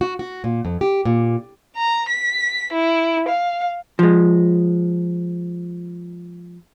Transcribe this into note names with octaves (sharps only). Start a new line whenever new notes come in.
F#4
F#4
A#2
F2
G4
A#2
A#5
B6
E4
F5
F3 G#3